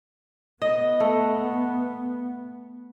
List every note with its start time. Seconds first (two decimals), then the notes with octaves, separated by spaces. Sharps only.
0.62 B3 D#5
1.00 A3